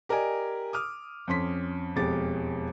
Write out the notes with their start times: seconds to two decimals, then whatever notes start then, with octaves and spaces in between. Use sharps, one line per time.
0.09 G4 A#4 D5 D#5 G#5
0.73 D6 D#6 F6
1.27 F2 C#4 C6 B6
1.96 E1 F2 G#3 G4 D6 A6